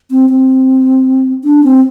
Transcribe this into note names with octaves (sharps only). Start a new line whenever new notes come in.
C4
C4
D4
C4